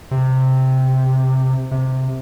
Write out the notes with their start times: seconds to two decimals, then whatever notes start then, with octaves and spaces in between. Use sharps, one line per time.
0.11 C3
1.71 C3